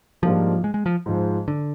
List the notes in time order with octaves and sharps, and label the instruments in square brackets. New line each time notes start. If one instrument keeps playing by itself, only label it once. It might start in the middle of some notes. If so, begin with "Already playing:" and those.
[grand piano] G#2 G3 A#3 D4 F4 [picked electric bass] F3
[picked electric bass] G#3
G#3
F3
[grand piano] G#2 F3 G#3
[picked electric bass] D3